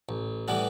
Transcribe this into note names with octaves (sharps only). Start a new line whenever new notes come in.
A1
A2 E3 G3 B3